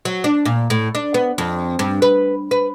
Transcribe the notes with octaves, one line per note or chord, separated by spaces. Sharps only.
F#3
D4
A#2
A2
D4
B3
F2
G2
B4
B4